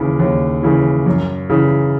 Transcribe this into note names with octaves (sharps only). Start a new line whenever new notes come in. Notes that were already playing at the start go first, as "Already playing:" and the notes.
Already playing: D#2 C#3 E3
D#2
C#3 E3
F#2
C#3 E3